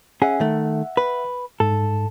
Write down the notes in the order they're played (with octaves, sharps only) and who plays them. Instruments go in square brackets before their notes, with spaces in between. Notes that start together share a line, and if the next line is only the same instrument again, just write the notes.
[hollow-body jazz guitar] C#4 G#4 [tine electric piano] E5 F#5
[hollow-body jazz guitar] D#3 A3
B4
[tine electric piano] G#2 [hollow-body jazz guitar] A4